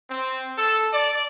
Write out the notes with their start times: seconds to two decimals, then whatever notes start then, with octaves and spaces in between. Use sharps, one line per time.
0.10 C4
0.57 A4
0.93 D5